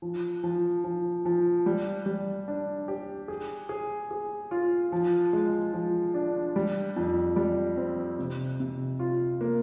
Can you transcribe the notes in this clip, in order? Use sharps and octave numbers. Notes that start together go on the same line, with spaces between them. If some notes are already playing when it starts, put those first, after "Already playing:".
F3
F3
F3
F3
G3
G3
D4
G4
G#4
G#4
G#4
F4
F3
G#3
F3
D4
G3
F2
G3
C4
C3
C3
F4
A#3